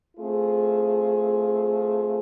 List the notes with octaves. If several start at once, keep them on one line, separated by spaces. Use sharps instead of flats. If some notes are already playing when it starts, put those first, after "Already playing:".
A3 C4 F4 G#4